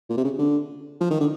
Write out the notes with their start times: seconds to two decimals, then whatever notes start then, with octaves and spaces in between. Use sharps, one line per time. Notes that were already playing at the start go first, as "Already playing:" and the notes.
0.09 A#2
0.17 C3
0.25 C#3
0.39 D3
1.01 F3
1.11 D#3
1.20 D3